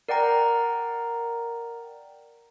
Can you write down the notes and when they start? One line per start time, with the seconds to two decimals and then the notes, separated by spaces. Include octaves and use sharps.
0.09 A#4 D5 F#5 G5 A#5